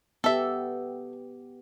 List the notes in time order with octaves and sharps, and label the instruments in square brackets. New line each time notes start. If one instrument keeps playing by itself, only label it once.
[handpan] B3 G4 [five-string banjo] A4 E5